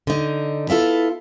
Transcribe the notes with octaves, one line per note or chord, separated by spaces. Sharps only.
D3 D#4
B3 E4 F4 A4